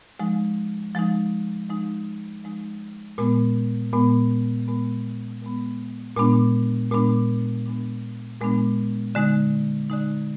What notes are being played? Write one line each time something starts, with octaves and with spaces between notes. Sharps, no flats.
F3 G#3 D#4
F3 G#3 D#4
F3 G#3 D#4
F3 G#3 D#4
A#2 G#3 B3
A#2 G#3 B3
A#2 G#3 B3
A#2 G#3 B3
A#2 G#3 B3 D4
A#2 G#3 B3 D4
A#2 G#3 B3 D4
A#2 G#3 B3 D4
D3 G#3 D#4
D3 G#3 D#4